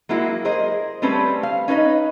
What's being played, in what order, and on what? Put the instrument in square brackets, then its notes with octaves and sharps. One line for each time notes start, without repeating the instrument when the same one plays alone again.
[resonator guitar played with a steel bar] F#3 G#3 A#3 E4 F#4
G#4 A#4 C5 D#5
G3 A3 C4 C#4 B4
F5
C#4 D#4 B4 D#5